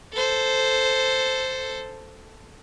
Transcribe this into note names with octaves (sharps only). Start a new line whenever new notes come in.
A4 C5